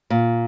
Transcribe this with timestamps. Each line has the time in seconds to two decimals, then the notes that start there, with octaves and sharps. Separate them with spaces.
0.10 A#2